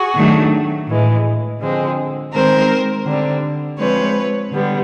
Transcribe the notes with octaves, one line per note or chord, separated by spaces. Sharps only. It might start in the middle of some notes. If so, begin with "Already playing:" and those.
Already playing: F#4 G#4
D#3 F#3 A3 D4
A2 E3 G#3
D3 F3 G#3 C4
D#3 G#3 C4 A#4 C5
D3 G3 C4
F3 G#3 C4 B4 C#5
D3 G3 B3